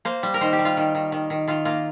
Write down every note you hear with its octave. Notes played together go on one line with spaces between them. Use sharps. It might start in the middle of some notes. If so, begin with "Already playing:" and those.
A#3 C5
G3
A#4
D#3 C5
G4
G3
F4
D#3
D#3
D#3
D#3
D#3 F4
A#3 F4